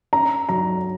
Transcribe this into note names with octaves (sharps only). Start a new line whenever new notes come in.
C#4 A#5
F#3 A#5